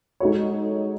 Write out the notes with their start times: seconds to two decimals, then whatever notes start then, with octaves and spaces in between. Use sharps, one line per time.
0.20 G#3 D#4 F#4 A4 C#5